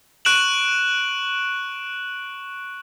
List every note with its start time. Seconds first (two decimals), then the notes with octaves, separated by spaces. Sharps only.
0.25 C#6 F#6 D7 E7 F#7